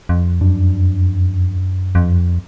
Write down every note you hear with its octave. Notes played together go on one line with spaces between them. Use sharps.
F2
F#2 D4
F2